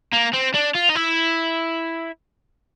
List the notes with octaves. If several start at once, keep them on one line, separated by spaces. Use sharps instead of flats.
A#3
C4
D4
F4
D#4
E4